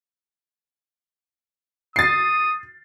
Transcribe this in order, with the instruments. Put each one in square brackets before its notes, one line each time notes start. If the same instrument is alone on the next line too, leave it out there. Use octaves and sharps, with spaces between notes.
[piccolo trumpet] D#6 [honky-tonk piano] A6 C7